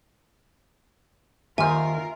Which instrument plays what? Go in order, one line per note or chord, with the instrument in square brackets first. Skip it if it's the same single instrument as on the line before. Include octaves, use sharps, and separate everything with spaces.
[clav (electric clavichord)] D#2 C5 [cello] F4 A#4 [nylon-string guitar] E5 [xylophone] G#5 F6